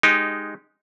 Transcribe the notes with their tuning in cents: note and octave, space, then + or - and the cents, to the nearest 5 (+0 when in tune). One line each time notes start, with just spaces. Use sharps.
G#3 +0 D#4 -10 G4 +0